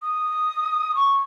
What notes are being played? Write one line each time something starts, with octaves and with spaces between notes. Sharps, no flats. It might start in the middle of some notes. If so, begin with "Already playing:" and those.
D#6
C#6